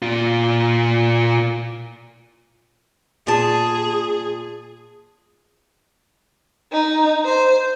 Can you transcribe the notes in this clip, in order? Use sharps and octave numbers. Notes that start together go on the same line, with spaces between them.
A#2 F4
A#2 G#4 A5
D#4
C5